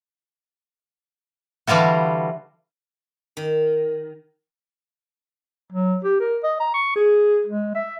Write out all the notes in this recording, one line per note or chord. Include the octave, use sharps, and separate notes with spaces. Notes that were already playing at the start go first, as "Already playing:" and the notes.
D3 E3 G3 F4 F#4
D#3
F#3
G4
A#4
D#5
A#5
C#6
G#4
G#3
E5